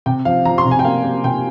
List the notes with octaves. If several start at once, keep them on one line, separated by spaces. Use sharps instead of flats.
C3 G5
F3 F5
F3 A#5
C6
C3
G#5
G5
A#3 F5
A#3
C3 G5